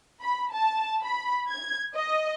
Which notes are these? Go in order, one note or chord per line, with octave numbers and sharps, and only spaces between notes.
B5
A5
B5
G#6
D#5